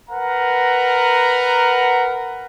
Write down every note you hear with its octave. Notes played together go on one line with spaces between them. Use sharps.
A#4 B4 F#5 A#5